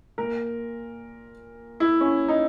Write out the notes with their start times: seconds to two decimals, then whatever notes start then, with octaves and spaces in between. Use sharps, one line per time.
0.18 A#2 A#3 A#4
1.80 E4
2.01 C#4
2.28 D#4